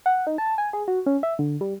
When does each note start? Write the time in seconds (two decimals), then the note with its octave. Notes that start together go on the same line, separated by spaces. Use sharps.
0.06 F#5
0.27 D#4
0.38 A5
0.58 G#5
0.73 G#4
0.88 F#4
1.06 C#4
1.23 E5
1.39 D3
1.61 G3